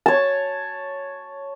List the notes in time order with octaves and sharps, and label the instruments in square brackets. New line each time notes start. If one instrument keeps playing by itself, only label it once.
[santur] C#5 A5